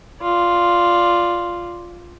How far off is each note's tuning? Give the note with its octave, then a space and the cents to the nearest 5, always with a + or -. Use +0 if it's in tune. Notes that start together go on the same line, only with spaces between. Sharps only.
F4 +0 D5 +0